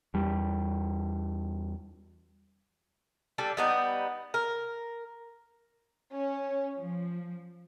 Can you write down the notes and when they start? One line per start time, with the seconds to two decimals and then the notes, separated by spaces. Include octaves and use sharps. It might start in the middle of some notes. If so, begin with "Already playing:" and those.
0.14 E2 G3
3.38 G3 D4 A4
3.57 G3 B3 D#4
4.34 A#4
6.11 C#4
6.76 F3